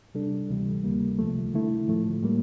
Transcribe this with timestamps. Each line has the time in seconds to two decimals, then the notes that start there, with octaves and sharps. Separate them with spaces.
0.15 C3 G3 D4 A4
0.49 D2 C3 E3 G3
0.84 D2 D3 G3 A#3
1.19 C2 C3 F3 A3
1.54 D3 A3 E4
1.88 A2 F3 A3
2.22 A2 G3 A#3